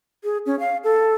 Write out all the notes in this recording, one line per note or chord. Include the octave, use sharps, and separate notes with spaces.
G#4
C#4
F5
A4